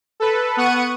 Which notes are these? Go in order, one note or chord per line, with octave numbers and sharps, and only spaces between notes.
A4 B4
B3 F#5 C#6 C#7 D#7